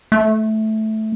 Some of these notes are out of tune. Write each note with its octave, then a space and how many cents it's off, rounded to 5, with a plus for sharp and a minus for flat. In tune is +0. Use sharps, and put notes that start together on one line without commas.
A3 -10